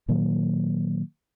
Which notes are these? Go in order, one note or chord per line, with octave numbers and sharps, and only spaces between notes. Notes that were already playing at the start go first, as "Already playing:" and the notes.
A#2 D#3 F#3 A#3